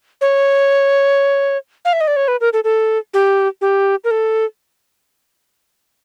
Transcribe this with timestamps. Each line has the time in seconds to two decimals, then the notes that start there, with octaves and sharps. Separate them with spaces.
0.21 C#5
1.85 F5
1.93 E5
2.01 D#5
2.07 D5
2.16 C#5
2.28 B4
2.41 A#4
2.53 A4
2.64 A4
3.14 G4
3.61 G4
4.04 A#4
4.11 A4